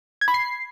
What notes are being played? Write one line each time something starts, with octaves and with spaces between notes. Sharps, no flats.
G#6
B5
C7